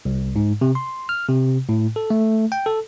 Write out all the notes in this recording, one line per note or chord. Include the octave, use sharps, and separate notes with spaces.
C2
G#2
C3
C6
F6
C3
A2
A4
A3
G5
A4